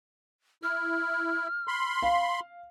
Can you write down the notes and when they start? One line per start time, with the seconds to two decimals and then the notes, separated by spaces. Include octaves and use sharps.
0.63 E4 F6
1.68 B5 C6
2.02 F5